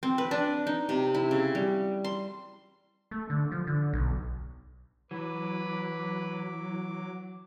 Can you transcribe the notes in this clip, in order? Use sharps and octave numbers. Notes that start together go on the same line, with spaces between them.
C4
B4
D4
D#4
C3
E4
C#3
G3
C6
A3
D3
F3
D3
B1
E3 F#3 B4 D6